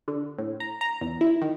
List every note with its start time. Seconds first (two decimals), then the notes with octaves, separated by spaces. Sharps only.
0.08 D3
0.38 A2
0.60 A#5
0.81 A#5
1.01 E2
1.21 E4
1.41 D#3